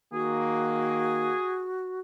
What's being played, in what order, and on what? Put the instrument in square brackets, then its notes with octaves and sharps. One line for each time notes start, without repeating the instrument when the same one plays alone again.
[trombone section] D#3 A#3 [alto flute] F#4 [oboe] G#4